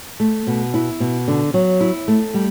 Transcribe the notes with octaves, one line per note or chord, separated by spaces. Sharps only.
A3
B2
E4
B2
D3
F#3
E4
A3
G3